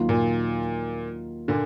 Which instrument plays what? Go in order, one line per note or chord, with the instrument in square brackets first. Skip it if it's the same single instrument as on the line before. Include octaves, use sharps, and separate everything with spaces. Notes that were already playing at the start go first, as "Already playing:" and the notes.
Already playing: [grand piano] D#2 D#3 F#3 A#3 F4
[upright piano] A#2
A#2 D3